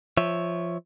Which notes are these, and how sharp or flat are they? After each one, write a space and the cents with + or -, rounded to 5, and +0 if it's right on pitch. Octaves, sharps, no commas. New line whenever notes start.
F3 -10 C#5 +0 E5 +0